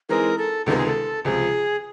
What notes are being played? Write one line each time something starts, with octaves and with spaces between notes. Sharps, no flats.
E3 G#3 C4 D#4 G#4 A#4
A4
C#2 C3 D#3 G#3 B3 A4
G#4
A4
C#2 C3 F3 G#4